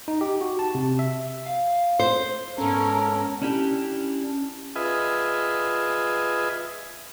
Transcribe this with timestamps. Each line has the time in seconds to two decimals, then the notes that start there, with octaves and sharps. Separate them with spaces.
0.08 D#4
0.21 G4
0.41 F#4
0.59 A5
0.75 C3
0.99 E5
1.46 F5
1.99 C5
2.58 G#2 B3 C#4 A4 A#4
3.42 C#4 D4 E4 G4
4.76 F4 G#4 B4 D#5 E5